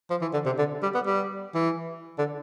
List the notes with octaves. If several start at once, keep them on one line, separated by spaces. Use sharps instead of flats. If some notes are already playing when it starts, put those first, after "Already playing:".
F3
E3
D3
C3
D3
G3
B3
G3
E3
D3